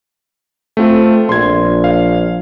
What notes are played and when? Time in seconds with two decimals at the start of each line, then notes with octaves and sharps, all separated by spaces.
0.77 A3 C4 F4
1.29 A#1 C6 G#6
1.84 F5